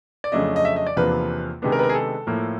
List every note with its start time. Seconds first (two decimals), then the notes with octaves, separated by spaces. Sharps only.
0.24 D5
0.32 F2 C#3 F#3 A3 D4 D#5
0.56 D#5
0.65 E5
0.76 D#5
0.87 D5
0.97 E2 C3 F3 A#3 D4 B4
1.62 C3 D#3 G#3 B3 D4
1.72 A#4
1.79 B4
1.83 A#4
1.89 G#4
1.94 A4
2.27 A2 F3 A#3